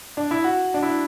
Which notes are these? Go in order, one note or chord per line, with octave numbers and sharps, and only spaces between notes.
D4
E4
F#4
D4
E4